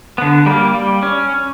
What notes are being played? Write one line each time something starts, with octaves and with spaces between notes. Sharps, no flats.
D3 B3
G3 A#3
G3
C#4